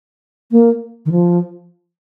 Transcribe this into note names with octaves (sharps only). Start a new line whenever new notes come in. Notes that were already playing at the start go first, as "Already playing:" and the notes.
A#3
D#3
F3